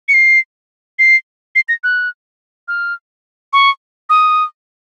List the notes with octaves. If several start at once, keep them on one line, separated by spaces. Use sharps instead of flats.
C#7
C7
C7
C7
A#6
F#6
F6
C#6
D#6